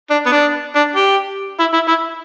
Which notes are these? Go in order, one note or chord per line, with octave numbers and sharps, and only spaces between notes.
D4
B3
D4
D4
G4
E4
E4
E4